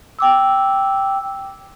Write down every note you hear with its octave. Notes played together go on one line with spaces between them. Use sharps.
G5 D6 E6